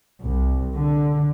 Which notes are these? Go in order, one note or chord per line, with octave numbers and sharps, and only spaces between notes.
C2
D3